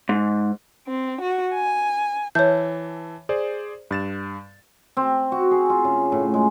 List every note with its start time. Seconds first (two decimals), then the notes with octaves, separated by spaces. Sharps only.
0.09 G#2
0.87 C4
1.21 F#4
1.54 G#5
2.35 E3 C#5 E5 A5 G6
3.29 G#4 C5 D5
3.91 G2 A6 E7
4.97 C4
5.32 F#4
5.51 G#4
5.69 F4
5.84 C#3
6.12 A2
6.34 G#3